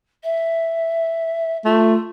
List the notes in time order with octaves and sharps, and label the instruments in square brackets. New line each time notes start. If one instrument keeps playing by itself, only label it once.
[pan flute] E5
[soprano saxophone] A3 [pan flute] F4